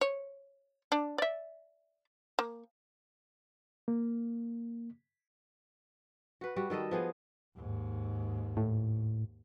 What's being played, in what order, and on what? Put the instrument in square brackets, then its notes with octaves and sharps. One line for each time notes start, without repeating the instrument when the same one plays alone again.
[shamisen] C#5
D4
D5 E5
A#3
[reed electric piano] A#3
[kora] F#4 B4
G3 F#4
D#3 G3 A4 D#5
F3 B3 G#4
[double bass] D#2 G#2
[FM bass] A2